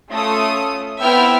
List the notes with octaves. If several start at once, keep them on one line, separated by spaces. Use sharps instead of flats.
A3 C#4 F4 D#6
B3 C4 E4 E5 G5 F6